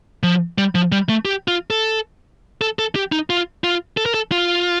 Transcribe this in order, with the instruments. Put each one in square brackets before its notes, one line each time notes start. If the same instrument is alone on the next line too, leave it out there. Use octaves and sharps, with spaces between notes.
[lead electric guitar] F3
G3
F3
G3
A3
G4
F4
A4
A4
A4
G4
D#4
F4
F4
A4
A#4
A4
F4